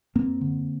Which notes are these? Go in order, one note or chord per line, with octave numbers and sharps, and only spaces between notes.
F#2 A#3 C4
D3